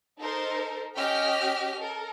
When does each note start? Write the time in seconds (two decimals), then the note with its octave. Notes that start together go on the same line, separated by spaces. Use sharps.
0.18 D#4 A4 A#4 C5
0.97 C#4 G4 D#5 G5 F6 B6
1.80 A4 A#4